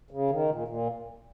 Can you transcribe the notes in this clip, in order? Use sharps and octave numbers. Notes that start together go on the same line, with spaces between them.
C#3
D#3
A#2
A#2